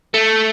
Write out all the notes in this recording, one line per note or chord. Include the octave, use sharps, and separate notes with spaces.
A3